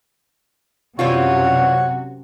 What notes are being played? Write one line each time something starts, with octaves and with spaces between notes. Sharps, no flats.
F#2 C3 E3 G3 F4 F#4 C#5 F#5